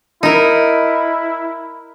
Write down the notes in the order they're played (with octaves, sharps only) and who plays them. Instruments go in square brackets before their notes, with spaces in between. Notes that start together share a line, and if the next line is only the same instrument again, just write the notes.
[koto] D#4 A#4 [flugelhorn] E4